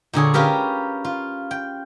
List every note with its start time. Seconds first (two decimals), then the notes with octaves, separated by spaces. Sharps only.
0.13 A#2 D3 G#4 C#5
0.34 C#4 F4 G4 A#4 B4
1.05 F4
1.51 G5